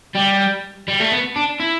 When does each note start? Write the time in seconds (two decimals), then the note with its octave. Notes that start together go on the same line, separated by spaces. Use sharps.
0.15 G3
0.88 G3
1.00 A3
1.12 B3
1.36 D4
1.60 E4